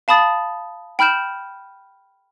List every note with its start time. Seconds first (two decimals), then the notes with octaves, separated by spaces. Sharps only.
0.08 F5 A5 B5 D#6 A6
0.99 G5 B5 F6 G6 E7